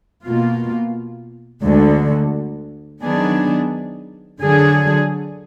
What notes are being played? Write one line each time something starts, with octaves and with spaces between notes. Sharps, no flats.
B2 A#3 F4
D2 D3 G#3
D#3 F#3 B3 D4 G#4
D3 F#3 D4 G#4